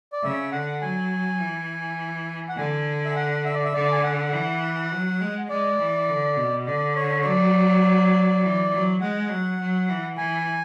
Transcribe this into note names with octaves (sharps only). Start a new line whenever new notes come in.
D5
C#3 E5
D3 F#5
F#3 G#5
E3
F#5
D3 G#5
E5
F#5
E5
D5
E5
D3 D5
G#5
F#5
E3
F#3
G#3
G#3 D5
E3
D3
B2
D3 D5
C#5
C#5
F#3 D5
E3
F#3
G#3 F#5
F#3
F#3
E3
E3 G#5